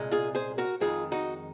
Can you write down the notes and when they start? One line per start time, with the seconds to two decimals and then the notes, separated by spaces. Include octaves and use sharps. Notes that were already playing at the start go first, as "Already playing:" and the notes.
Already playing: C2 A#2 G#3
0.12 F4 G#4
0.35 G#4 C5
0.58 F#4 A#4
0.81 F2 D#3 G#3 F4 G#4
1.12 D#4 F#4